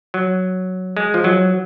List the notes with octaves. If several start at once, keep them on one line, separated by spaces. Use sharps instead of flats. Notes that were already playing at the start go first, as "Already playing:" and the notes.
F#3
G#3
F3
F#3